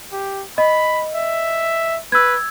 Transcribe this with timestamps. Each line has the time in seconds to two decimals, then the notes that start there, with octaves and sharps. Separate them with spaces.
0.12 G4
0.58 D#5 B5
1.14 E5
2.12 B4 E6 G#6